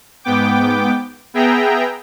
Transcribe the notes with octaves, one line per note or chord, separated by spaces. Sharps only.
G#2 B3 G5 D6
B3 G#4 E5 G5 A#5